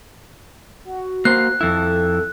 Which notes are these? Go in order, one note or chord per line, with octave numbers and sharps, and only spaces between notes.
F#4
A#3 C5 F#6
F2 E4 A4